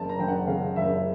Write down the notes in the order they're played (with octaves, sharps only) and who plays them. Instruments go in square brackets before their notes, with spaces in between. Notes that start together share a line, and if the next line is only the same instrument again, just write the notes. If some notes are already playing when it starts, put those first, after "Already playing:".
Already playing: [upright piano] F#1 A5
A#5
F#1 G5
F#5
C#3 F5
F#1 E5